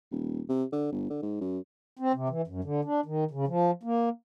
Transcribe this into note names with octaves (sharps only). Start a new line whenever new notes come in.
D#1
C3
D3
G1
D3
G#2
F#2
C4
C3
E3
F#2
D3
D4
D#3
C#3
F3
A#3